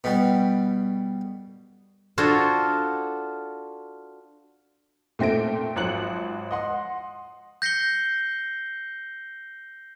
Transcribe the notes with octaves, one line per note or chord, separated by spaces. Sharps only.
B2 G3
D4 F4 F#4 A4 C5 C#5
A#2 A3 C4 A#6 D7
G#1 F3 F#3 F#6 C#7 F#7
D#5 F#5 C6
G6 A#6 C7 C#7 G7